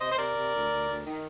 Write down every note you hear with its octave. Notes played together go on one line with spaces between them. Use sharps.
C3 C5 D#5
C5
C3 A#4 D5
C3
D2
D2
D2
D#3